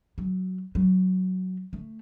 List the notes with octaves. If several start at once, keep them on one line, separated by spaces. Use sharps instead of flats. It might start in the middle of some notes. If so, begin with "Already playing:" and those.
F#3
F#3
A3